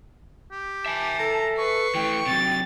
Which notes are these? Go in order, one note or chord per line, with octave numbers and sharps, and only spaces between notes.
G4
E5 G#5 A5
A4 A#5
B4 C#6 C7
E3 A3 G5
C3 F#3 A6